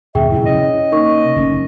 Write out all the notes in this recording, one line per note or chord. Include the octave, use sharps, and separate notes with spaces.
D#2 B2 G#4 E5 G5
F2 A#2 C#3 E4
C3 C#4 D#5
A#3 D#4 A#4 C#6
F#1 C3 A3 C#4